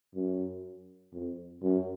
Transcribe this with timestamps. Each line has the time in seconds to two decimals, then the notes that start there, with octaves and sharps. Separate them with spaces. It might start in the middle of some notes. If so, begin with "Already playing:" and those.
0.15 F#2
1.13 F2
1.63 F#2